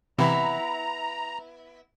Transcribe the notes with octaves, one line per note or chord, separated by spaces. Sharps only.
C3 E3 B3 E4 A#5